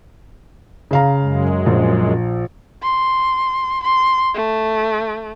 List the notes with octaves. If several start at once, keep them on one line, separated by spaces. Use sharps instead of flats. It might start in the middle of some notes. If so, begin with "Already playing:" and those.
C#3 F5 A#5
F#2 G#3
A#1
C6
C6
A3